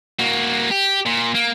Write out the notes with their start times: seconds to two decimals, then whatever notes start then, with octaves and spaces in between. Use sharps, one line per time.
0.19 A#3 F#4
0.71 G4
1.06 A#2
1.35 A#3